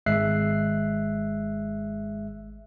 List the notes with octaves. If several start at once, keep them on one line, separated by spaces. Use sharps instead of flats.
G#1 G#3 E5 F#6 C7